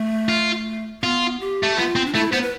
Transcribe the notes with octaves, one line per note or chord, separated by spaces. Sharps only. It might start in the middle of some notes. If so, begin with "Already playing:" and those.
Already playing: A3
F4
B3 F4
G4
A3
B3 F4
C4
D4
A3 E4
B3 C5
B4